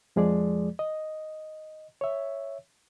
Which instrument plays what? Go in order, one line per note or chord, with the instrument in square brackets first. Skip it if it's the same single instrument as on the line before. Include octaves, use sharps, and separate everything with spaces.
[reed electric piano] F2 F3 G#3 G#4 D5
D#5
C#5 E5